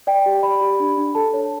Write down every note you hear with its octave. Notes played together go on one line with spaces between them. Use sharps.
D5 G5
G4
D5 B5
G4
D4
D4
A4 A5
C#5